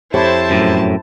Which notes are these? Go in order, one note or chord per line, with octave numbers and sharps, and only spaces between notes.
F2 E4 G4 C5 C#5 A5
F#2 A2